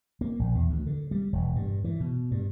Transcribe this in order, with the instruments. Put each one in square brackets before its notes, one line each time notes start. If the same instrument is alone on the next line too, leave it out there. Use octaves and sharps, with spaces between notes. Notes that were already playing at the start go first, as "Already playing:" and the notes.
[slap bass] A#3
A#1
E2
D2
D3
G3
E1
G2
E3
B2
G2